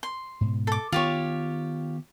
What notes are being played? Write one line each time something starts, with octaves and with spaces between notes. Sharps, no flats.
C6
G#2 B2
A4 D6
D#3 B3 F4 G4 C#5